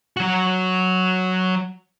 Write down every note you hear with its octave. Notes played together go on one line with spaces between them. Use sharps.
F#3 F#4